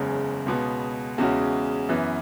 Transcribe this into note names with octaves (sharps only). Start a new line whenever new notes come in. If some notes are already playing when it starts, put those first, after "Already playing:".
Already playing: F#1 E2 C#3 G#3
C#2 B2 B3
E2 C#3 G#3 C#4 F#4
F#2 E3 B3